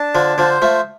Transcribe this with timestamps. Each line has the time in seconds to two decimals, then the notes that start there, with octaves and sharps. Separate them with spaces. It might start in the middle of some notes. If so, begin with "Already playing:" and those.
Already playing: D4 A5
0.15 D3 F3
0.38 D3 F3 C5
0.62 F3 A3